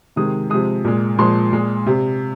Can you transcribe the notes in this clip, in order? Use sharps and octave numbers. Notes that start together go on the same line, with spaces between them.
C3 D#3 G#3 D#6
C3 F3 G#3 D#6
A#2 G#3
A#2 F3 G#3 C6
A#2 G#3
C3